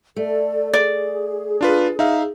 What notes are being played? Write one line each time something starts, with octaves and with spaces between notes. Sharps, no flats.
A3 A4 D5
G#4 D5
D4 F4 B4
D#4 E5 F5